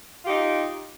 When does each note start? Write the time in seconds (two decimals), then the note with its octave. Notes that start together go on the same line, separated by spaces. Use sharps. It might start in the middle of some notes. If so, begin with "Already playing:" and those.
0.23 F4
0.26 G4
0.29 D#4